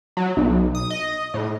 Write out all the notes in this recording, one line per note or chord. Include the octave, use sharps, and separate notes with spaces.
F#3
B1
D#6
D#5
A2